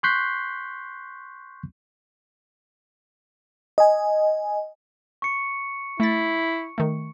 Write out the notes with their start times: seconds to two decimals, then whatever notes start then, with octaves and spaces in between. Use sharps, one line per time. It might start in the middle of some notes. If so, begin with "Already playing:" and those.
0.03 C6 C#6 F#6 G6 B6 C7
3.78 D#5 G#5
5.22 C#6 C#7
6.00 A3 E4 A6
6.78 D#3 A3